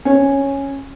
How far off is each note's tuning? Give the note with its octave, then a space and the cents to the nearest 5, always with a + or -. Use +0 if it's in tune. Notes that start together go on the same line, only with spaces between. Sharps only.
C#4 -5